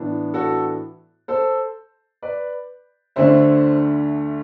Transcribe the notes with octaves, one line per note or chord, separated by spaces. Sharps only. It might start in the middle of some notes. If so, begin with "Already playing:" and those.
Already playing: A2 E3 B3 D4
F#4 A4
A4 C5
B4 D5
D2 D3 A3 D4 C5 E5